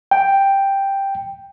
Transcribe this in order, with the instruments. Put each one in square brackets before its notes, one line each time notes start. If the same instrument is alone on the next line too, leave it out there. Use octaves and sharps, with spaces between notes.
[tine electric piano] G5